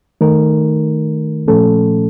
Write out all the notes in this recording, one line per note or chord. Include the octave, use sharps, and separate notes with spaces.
D#3 A3 D#4 A#4
A#2 F3 A3 C#4 A4